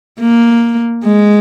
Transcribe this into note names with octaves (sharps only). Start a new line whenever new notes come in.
A#3
G#3